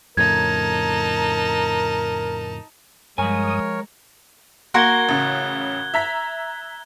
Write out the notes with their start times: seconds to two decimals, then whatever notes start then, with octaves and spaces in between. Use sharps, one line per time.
0.17 F2 A2 C#3 D#4 A#4 A5 G#6
3.18 G2 F3 G#3 A#4 C#5 G#5 D#6
4.74 A#3 F#4 A#4 C6 F#6 G#6 G7
5.09 A1 C#3
5.94 E5 A#5 B6